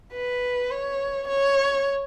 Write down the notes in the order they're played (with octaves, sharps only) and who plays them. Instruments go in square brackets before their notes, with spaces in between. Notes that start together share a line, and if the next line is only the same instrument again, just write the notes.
[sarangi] B4
C#5
C#5